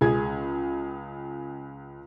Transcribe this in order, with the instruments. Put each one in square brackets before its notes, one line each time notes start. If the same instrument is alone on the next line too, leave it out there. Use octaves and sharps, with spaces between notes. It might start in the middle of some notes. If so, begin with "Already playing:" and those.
[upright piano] C#2 G#4 G#6